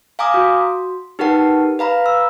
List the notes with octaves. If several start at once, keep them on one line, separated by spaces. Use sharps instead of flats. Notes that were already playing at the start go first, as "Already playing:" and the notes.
F5 G#5 A#5 D6 D#6
F#4
D#4 G4 A#4 B4 F#5 A5
B4 F5 A#5 B5
E6